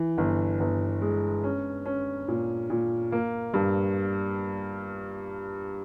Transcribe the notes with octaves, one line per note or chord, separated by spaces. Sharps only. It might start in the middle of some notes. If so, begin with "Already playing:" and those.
Already playing: E3
G1
G1
G#3
C#4
C#4
A#2
A#2
A#3
G2